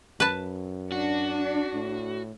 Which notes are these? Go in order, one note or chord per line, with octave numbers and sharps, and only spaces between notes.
F#2 B4 A5
D4 F#4
A2